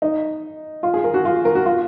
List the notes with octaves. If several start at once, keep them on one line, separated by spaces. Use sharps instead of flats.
D#4
F4
G#4
A#4
F#4
F4
A#4
F#4
F4